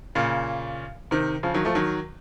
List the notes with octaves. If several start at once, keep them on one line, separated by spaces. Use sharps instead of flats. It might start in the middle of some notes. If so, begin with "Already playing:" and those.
A#2 C#3
C3 D#3
C#3 F3
D#3 F#3
F3 A3
D#3 F#3